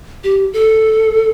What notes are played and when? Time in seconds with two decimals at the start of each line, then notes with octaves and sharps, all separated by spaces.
0.24 G4
0.53 A4